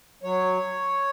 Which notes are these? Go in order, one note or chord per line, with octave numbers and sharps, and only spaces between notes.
F#3 C#5